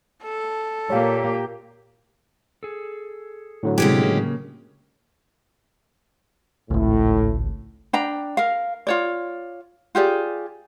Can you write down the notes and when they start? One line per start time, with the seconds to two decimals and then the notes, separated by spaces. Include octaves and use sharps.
0.23 A4
0.90 A#2 A#3 G4 C#5 F5
2.63 G#4 A4
3.63 A2 D3 F#3
3.78 C3 E3 G#3 C#4 G4
4.03 C#3 A#3
6.70 G#1 C#2 A2
7.93 D4 G5 A#5
8.37 A#4 F5
8.87 F4 C#5 D5
9.95 F4 G4 G#4 D5